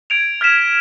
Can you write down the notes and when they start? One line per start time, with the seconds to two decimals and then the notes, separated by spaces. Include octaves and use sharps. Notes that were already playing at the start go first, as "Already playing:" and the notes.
0.10 G#6 D7 F7
0.41 F6 G#6 B6 E7